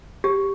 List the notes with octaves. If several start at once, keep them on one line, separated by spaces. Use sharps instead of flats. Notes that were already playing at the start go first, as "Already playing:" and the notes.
G4